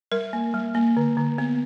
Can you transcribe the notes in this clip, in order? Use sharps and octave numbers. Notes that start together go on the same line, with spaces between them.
G3 A#4
A#3
G3
A#3
D3
D3
B3